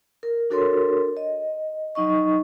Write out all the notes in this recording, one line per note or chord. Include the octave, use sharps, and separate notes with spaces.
A#4
D4 F#4 A4 A#4 C#5 C6
D#5
F#3 D#4 D#5 C#6